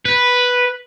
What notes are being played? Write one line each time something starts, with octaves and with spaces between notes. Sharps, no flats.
B4